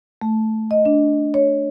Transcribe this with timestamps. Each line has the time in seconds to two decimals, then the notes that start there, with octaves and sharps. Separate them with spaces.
0.22 A3
0.71 D#5
0.86 D4
1.34 C#5